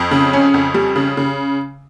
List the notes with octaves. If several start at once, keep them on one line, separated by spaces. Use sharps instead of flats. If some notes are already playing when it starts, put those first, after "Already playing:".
Already playing: F2
C#3
C#4
F2
G3
C#3
C#3